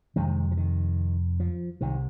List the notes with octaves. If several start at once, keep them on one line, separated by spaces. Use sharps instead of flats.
F1 F2 C3 D#3 G#3
F3
D#3
F3
C2 C3 D#3